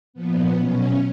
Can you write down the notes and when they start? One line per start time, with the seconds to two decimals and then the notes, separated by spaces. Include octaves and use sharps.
0.14 A#2 F3 B3
0.55 B2 F#3 C#4